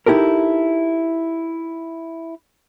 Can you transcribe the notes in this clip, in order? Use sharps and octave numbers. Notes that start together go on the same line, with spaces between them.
D#4 E4 G4 A4 A#4